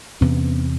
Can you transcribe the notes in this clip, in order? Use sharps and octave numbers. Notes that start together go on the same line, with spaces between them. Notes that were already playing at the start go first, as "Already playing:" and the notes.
E2 C3 B3 C#4